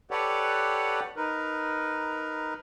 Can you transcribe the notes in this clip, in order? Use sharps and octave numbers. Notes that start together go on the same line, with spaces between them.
G4 A4 B4 C#5 D5 F#5
D#4 A#4 B4